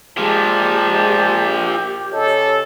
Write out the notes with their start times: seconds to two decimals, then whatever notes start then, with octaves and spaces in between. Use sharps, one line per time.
0.17 A#2 F3 G#3 G4 A5
2.13 C#3 A4 C#5 D#5